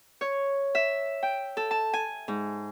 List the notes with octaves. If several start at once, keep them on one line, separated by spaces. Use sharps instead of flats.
C#5
E5
G5
A4
A5
G#5
G#2